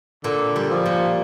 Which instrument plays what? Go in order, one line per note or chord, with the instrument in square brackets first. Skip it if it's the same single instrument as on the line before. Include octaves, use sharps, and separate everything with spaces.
[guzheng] A#2 [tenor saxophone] D3
[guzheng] G3
[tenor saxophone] F3
[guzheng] A#2